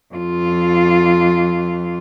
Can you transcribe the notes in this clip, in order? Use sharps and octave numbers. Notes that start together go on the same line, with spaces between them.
F2 F4